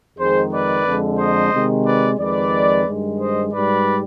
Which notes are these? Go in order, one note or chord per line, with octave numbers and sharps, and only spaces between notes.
F2 D#3 G#3 G#4 C5
B4 D5
F2 D3 G#3
C5 D#5
C3 D#3 G#3
B4 D5
F2 D#3 G#3 B4 D5
G2 D#3 G#3
C5 D#5
G#2 G3 B4 D5